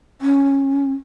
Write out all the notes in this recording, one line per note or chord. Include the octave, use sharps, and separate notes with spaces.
C#4